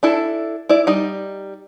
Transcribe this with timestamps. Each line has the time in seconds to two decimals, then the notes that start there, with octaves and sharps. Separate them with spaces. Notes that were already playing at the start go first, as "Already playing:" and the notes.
0.03 D4 E4 A4
0.69 E4 D5
0.87 G3 D#4